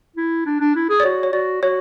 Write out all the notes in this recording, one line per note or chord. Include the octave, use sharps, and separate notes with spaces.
E4
D4
D4
E4
G#4
D5
F#4 C#5
C#5
F#4 D5
F#4 C#5